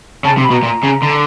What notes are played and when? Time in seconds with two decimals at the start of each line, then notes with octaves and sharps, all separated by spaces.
0.24 C#3 A5
0.38 C3
0.44 B5
0.50 B2
0.54 A#5
0.63 A#2
0.83 C#3
1.02 D3